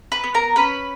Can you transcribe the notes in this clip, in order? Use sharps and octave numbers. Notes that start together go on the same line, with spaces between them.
B4 B5
B3
A#4 A#5
C#4 B4 B5